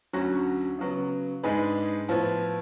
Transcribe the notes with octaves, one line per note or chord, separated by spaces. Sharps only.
D2 D3 F#3 C#4 F#4
C#3 F#3 B3
G#2 G#3 D4 G#4 B4
A2 F3 B3